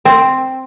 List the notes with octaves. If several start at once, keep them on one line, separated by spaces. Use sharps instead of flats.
C4